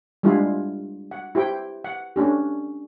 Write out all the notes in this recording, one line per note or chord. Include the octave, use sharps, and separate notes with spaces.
G3 G#3 D4 E4 F4
F#5
E4 G4 C5 G5
F#5
A3 C#4 D4 G4